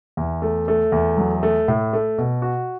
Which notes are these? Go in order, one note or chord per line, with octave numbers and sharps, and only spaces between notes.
E2
A3
A3
E2
F#3
A3
A2
A3
B2
F#4